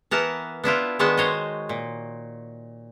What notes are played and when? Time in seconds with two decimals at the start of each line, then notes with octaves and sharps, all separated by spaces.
0.11 E3 B3 A#4 F#5 A5
0.64 B3 D4 E4 F4
0.99 D#3 G#3 B3 D4 F#4 A5
1.17 C5 C#5 D#5
1.69 A#2